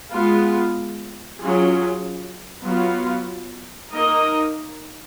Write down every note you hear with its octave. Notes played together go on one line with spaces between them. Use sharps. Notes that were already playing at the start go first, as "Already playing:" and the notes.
G#3 B3 F4
F#3 C#4 F4 G#4
F#3 B3 F4
A#3 D#4 A#4 D#5